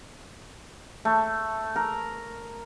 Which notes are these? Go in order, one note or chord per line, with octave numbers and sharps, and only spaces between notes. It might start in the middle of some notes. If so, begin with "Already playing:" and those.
A3
A#4